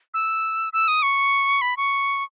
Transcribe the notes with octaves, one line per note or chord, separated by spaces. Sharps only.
E6
E6
D#6
C#6
B5
C#6